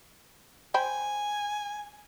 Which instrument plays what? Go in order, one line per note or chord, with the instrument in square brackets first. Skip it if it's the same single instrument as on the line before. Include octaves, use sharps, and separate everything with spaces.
[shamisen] C5 G5 B5 [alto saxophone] G#5